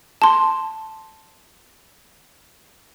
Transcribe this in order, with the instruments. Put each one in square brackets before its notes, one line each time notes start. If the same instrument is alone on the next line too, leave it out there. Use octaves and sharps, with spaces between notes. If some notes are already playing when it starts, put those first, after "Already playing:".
[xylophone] A5 C6